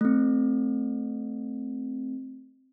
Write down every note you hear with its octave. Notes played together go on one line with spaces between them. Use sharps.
A3 C4